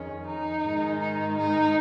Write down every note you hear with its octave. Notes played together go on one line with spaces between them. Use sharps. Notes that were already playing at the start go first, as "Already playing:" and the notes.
Already playing: F2 D#3 G#3 C#4
D#4
G#2 D#3 G#3
D#4
D#4